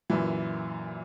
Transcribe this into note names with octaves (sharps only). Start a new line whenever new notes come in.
F#2 A#2 E3